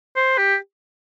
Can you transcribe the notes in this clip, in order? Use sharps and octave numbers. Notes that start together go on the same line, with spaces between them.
C5
G4